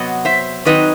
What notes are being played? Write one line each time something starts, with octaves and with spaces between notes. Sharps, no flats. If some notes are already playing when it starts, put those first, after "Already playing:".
Already playing: C3 F#3 B3 D#5 F#5
C5 E5
D#3 F#3 C4 D#4 B4 D#5